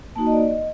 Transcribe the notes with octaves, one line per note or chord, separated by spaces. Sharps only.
A#3 D#4 F#4 A5
D#5
D5
D#5